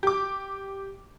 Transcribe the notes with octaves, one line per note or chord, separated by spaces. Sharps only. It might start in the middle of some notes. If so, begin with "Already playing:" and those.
G4 D6